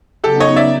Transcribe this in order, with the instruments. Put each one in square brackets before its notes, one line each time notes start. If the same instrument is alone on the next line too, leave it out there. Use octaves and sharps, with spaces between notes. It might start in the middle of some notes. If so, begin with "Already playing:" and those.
[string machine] C#3 F#3 B3 D#4 [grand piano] G4 A4
[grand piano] C#5 D#5
D5 E5